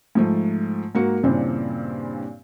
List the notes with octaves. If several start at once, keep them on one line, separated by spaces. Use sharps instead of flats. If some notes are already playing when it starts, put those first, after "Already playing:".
G#2 F3 A3
G#2 A#3 F#4 C#7
G2 A#2 C#3 E3 C4 D4